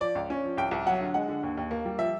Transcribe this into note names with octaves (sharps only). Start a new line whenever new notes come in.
F3 D5
C#2
C#4
F3
C2 G5
C2
F#3 F#5
D3
G#3 F#5
D3
D#2
D#2
A#3
G3
F3 E5